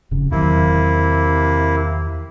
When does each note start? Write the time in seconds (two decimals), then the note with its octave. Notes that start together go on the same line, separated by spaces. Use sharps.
0.11 F1 C#3
0.31 E2 C3 D#3 F#3 A#3 E4